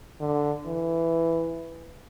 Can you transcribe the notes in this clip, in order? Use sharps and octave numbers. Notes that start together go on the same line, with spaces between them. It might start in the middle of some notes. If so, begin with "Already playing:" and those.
D3
E3